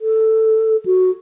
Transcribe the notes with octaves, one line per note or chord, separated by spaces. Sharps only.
A4
F#4